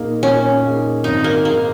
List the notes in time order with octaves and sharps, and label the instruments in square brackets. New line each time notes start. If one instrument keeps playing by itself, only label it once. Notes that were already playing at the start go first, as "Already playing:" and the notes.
Already playing: [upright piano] A#2 A#3 D#4 G#4
[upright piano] A#2 [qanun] C#4
[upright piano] A#3 D#4 G#4
[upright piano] G#1 [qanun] D#4
[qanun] A#3
[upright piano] G#2 D#3 [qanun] A#3